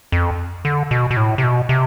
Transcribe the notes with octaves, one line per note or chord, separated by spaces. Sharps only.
F2
D3
B2
B2
A2
C3
B2
C3